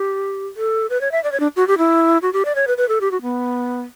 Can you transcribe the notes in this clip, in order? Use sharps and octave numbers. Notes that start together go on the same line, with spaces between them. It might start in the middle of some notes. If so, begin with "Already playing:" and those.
Already playing: G4
A4
B4
C#5
E5
D5
C#5
D4
F#4
G4
E4
F#4
G4
D5
C#5
B4
B4
A4
G4
F#4
B3